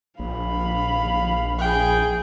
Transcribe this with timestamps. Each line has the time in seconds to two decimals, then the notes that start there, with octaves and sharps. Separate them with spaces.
0.19 A#1 F5 B5
1.59 G#4 G5